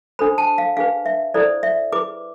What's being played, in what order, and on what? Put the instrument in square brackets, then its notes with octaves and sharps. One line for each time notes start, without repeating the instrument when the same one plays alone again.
[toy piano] D4 A4 C5 B5
A5
F5
D4 G#4 B4 F5
E5
E4 A4 C5 D5
E5
E4 G#4 B4 D6